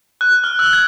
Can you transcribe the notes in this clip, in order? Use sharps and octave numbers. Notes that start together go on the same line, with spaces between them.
F#6
F6
E6
G#6